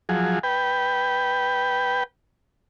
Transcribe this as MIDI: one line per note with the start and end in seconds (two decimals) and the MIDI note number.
0.09 0.39 53
0.09 0.39 54
0.09 0.39 68
0.43 2.03 71
0.43 2.03 79